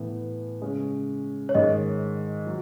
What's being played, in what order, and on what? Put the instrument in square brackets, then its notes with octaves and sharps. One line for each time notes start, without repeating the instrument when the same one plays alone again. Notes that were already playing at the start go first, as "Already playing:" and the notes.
Already playing: [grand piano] A2 E3 B3
C#3 G#3 C#4
[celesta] C#5
[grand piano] G#2 D#3 G#3 [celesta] D#5
[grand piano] F#3